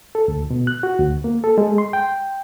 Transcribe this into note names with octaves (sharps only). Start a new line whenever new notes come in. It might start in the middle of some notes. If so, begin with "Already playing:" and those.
A4
D2
B2
F#6
F#4
D2
A#3
A4
G#3
C6
G5